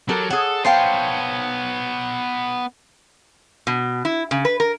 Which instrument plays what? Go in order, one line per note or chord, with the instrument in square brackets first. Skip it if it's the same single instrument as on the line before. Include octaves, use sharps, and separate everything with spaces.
[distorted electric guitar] F#3 [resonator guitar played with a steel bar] G4 A4 A#4
[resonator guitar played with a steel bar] G#4 C#5 [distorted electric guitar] A4 [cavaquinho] F#5
[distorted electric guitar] B3 C#5 [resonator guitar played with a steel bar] C5 F5 [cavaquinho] G5 A5 C6
[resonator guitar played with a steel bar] B2
E4
C#3
B4
A#4